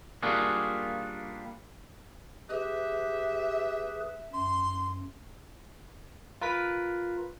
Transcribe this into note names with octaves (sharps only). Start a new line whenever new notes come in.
G3 A#3 D4 F4 F#4 G#4
G4 G#4 B4 E5
F#2 C6
F4 A#4 B4 B6